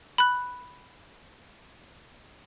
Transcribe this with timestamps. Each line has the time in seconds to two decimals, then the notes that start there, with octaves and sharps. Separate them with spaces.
0.18 B5 F#6